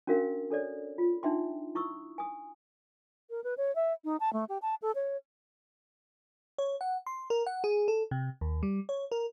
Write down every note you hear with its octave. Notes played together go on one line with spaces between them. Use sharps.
C#4 D4 F#4 A#4 F5
D4 A4 C#5 D5
F4
D4 D#4 E5 G5 C6
E4 C#6 D#6 E6
G#5 D#6
A#4
B4
C#5
E5
D#4
A5
A3
G4
A5
A4
C#5
C#5
F#5
C6
A#4
F#5
G#4
A4
C3
D#2
G3
C#5
A#4